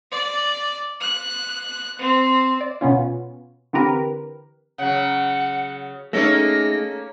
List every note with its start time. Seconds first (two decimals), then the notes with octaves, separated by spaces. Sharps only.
0.11 D5
1.01 F#6
1.99 C4
2.61 D5
2.81 B2 B3 C#4 F4
3.73 D3 E3 C4 G4 A#4 B4
4.78 C#3 F#3 F#5
6.13 A3 A#3 C#4 D#4 G#4 A4 A#6